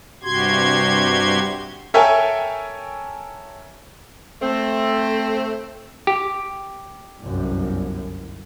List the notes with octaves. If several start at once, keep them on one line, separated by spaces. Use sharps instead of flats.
G2 C3 F#4 G4 C6 G#6
A4 A#4 C#5 E5 G5 G#5
A3 C4
G4
G1 C2 F#2